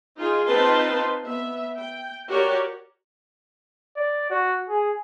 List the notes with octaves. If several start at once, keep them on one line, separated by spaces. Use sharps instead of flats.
D#4 F4 G#4
C4 D#4 F4 B4 A5 C6
B3 E5
G5
F#4 G4 A#4 C#5 D5
D5
F#4
G#4